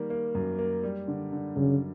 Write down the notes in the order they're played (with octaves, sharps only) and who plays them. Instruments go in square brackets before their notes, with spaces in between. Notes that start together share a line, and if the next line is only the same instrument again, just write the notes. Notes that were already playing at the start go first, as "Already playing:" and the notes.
Already playing: [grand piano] D#3 G3 A#3
A#3
F#2
A#3
G3
D3
D3
[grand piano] F#2 [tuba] C#3